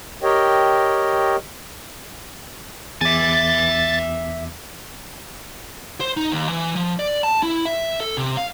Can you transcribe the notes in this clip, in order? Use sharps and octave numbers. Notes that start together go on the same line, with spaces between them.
G4 A#4 C#5 D#5 G5
E2 E5 G#5 D6 A6
C5
D#4
D#2
E3
F3
D5
A5
E4
E5
A4
C3
F5